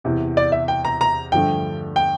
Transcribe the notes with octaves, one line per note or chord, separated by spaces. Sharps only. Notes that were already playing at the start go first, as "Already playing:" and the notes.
E2 C3 E3
D5
E5
G5
A#5
A#5
G2 D3 F3 A3 G5
G5